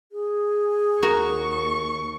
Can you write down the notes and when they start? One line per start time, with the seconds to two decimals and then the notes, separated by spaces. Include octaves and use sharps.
0.12 G#4
1.02 D#2 F#4 A#4 C#6